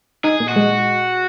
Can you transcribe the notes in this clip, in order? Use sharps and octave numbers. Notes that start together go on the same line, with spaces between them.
D#4 G#4
A#2
F#4
G#3